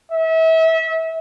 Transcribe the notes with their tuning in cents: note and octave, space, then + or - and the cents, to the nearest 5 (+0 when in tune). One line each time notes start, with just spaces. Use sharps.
E5 -30